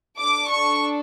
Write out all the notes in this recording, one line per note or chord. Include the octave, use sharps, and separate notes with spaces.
D4 A4 D6
C#6